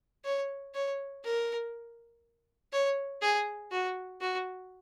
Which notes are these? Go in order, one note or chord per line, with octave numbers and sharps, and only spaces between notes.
C#5
C#5
A#4
C#5
G#4
F#4
F#4